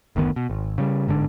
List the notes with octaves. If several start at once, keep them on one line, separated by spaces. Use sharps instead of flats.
F#1 D2 D#3 B3
B2
G#1
C#3 G3
G1 G#2 D3 D4